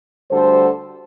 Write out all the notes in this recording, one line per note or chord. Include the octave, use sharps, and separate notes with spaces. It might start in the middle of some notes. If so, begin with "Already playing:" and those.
D2 D3 G3 A4 C5